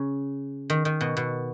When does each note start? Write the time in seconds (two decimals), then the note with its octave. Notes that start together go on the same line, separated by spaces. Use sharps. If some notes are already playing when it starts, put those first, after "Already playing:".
Already playing: C#3
0.70 D#3
0.85 D#3
1.01 B2
1.17 B2